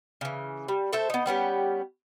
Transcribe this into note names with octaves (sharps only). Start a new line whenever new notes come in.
C#3 E3
G3
A3 A4 C5 E5
B3 D#4
G3 B3 C#4 G4